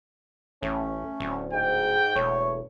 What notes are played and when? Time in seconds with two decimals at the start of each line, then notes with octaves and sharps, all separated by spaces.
0.63 A1 A3 C#4
1.20 D1
1.53 G#2 G5
2.16 E1 A3 C#5